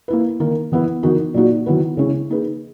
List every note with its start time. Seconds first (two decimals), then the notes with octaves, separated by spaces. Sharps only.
0.08 A#3 E4 B4
0.40 D#3 A#3 D#4 A#4
0.72 E3 B3 E4 B4
1.03 E3 B3 D#4 F#4 A#4
1.34 A#2 F#3 A#3 D#4 F#4
1.66 D#3 F#3 B3 E4 B4
1.97 C#3 G#3 C#4 E4
2.30 A#3 D#4 G#4 B4